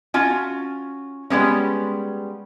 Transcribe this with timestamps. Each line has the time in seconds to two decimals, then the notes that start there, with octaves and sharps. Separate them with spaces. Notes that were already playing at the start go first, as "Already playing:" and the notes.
0.14 C#4 F4 F#4
1.30 G3 G#3 B3 C#4